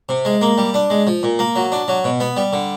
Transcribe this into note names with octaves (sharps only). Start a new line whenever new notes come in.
C3
G#3
A#3
G3
D4
G#3
F3
A#2
A#3
F#3
D4
F#3
B2
B3
G3
D3